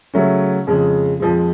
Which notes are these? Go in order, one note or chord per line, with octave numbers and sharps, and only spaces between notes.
C#3 F#3 A3 C#4
F2 C#3 G#3
F2 F3 G#3